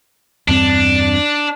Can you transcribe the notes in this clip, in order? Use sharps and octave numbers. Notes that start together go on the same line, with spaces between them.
E2 G2 C4 D4